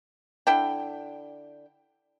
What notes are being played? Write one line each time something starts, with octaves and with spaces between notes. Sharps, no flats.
D3 E4 G5